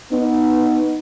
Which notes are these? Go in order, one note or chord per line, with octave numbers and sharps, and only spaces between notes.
B3 D#4